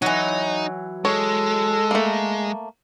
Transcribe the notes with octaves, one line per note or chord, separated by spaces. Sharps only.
E3 F#3 D#4
G#3 A4 C#5
A3 A#3